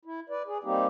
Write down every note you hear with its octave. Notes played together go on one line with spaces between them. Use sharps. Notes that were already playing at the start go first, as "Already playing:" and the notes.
E4
B4 D5
G#4
G3 A#3 C4 D#4 G4